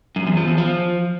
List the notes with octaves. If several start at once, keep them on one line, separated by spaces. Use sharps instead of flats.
F#2
E2
F3
E2
F3